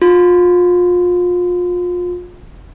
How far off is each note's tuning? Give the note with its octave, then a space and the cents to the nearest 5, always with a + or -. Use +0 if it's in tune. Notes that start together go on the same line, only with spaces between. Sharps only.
F4 +30